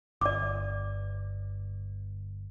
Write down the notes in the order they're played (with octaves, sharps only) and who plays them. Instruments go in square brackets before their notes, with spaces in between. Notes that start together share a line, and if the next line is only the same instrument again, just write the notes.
[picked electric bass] G1 [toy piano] D5 D6